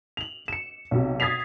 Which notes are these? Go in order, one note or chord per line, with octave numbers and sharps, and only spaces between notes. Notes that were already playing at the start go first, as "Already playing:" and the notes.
F7 F#7
C#7 E7
B1 C3
D#6 G#6 A6 B6 C7 F7